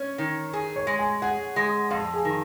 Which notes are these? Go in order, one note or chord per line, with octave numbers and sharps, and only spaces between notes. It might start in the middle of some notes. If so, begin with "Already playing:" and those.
Already playing: C#4 C#5
D#3
G#4
C#5
G#3
G#5
G#4 F#5
G#3
F2 F5
G#4
D#3